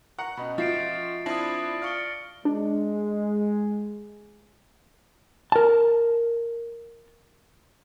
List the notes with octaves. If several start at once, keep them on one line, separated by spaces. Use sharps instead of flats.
F#5 A#5 C#6 F#6
B2 C#4 D#5 B5
F3 F4 F#4 E5 A6 C7 D7
C4 D4 E4 A5 D#6 A#6 C7 F#7
D5 F5 C#6 F6 C#7 G7
G#3 D4
A#4 A5